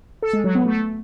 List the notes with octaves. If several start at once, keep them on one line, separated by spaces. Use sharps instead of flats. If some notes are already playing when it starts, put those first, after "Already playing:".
A4
G#3
F#3
B3
A3